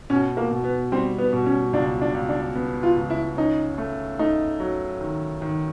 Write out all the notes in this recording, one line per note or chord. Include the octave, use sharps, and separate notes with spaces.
B2 C#4
A#3
B2
B3
G3 C4
B3
B2
C#4
C#2 D4
D4
C#2
D4
B3
F4
C#2
E4
C#4 D#4
A3
A3 D#4
F#3
D#3
D#3